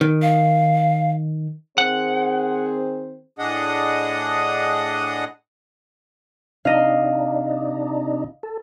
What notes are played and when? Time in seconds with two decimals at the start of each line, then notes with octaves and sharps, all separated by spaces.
0.01 D#3
0.22 F5
1.78 D#3 C4 G#4 C5 F#5
3.39 A2 D4 G#4 D#5 F#5 D#6
6.65 C3 D4 D#4 D#5 F5
8.43 A4